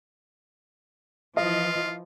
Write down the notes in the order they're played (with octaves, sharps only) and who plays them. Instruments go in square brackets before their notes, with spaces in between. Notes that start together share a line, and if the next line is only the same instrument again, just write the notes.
[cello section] E3 F3 [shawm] F4 [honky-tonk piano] D#5